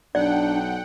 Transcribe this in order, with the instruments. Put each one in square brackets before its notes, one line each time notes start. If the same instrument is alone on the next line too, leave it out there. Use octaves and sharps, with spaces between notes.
[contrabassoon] B1 [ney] D4 [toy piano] D5 [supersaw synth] F#5 G5